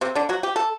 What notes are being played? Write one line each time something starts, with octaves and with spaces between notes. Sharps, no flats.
C3 C4
D3 D4
F#3 F#4
G4
A4